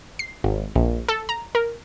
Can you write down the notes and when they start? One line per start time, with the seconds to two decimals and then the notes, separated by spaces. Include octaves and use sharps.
0.19 C7
0.44 G#1
0.76 A#1
1.09 A4
1.29 A#5
1.55 A#4